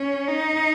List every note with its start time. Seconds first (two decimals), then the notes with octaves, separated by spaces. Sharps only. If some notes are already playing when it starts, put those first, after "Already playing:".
Already playing: C#4
0.28 D#4